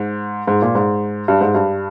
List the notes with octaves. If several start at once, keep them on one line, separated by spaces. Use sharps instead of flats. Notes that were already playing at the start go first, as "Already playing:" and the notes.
Already playing: G#2
G#2
A#2
G#2
G2
G#2
G2